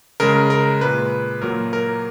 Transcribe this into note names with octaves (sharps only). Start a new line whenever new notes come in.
C#3 G#3 A#4
A#4
A#2 G#3 B4
A#2 F#3 A#3 A#4
A#4